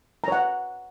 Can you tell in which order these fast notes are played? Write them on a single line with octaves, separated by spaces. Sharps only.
A#5 C#5 F#5